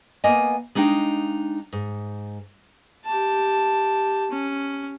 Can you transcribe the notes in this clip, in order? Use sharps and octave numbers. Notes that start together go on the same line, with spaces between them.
A#3 B3 D#5 G#5
G#3 D4 D#4 F5 G5
G#2
G4 A5
C#4